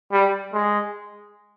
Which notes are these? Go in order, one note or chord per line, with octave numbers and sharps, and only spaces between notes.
G3
G#3